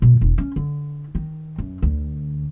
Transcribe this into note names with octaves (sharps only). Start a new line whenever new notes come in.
B2
E1
C#4
D3
D#3
F#2
D2